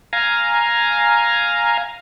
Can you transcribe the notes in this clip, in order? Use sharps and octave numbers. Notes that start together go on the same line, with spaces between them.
F5 G#5 A#5